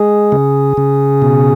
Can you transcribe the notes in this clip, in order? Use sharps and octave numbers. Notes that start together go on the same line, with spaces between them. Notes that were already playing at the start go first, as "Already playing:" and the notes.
Already playing: G#3 G#4
C#3
C#3
B2